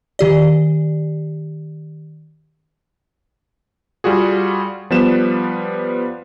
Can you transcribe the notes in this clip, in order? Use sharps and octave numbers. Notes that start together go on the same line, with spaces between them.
D#3 G4 D5
G3 F4 F#4 G#4
F3 G3 B3 B4 E7